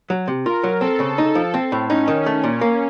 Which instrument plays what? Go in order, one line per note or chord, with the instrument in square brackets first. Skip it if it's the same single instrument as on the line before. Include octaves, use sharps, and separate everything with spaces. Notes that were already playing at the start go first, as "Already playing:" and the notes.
[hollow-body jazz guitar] F#3
C3
[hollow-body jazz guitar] F4 [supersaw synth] A#4
[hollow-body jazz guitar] F#3
[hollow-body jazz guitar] C4 [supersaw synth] A4
[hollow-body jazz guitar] C#3
D#4
F3
C4
A2
[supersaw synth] C#4 [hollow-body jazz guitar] D#4
[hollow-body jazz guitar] D#3
A3
A#2
A#3